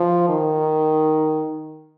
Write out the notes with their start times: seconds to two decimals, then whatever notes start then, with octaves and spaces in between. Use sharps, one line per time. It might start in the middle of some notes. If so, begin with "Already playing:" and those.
Already playing: F3
0.29 D#3